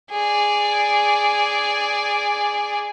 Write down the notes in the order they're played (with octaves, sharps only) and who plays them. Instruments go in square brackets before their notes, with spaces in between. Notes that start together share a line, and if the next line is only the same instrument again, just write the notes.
[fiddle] G#4 D5